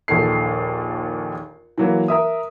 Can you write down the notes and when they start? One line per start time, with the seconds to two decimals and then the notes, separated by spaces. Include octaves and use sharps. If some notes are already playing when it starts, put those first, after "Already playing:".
0.08 A#1 D#2 A4 C7
1.78 E3 F#3 A#3
2.08 A#4 E5 D#6